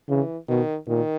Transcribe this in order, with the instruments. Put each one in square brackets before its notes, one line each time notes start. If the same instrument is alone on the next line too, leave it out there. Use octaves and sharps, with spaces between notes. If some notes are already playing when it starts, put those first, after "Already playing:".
[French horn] C#3 [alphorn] E3
[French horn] B2 [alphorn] D#3
[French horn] A#2 [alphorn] D#3